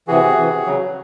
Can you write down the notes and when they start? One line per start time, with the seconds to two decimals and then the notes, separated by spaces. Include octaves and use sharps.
0.08 C3 E3 F#4 G#4
0.37 C3 E3
0.66 C#3 F#3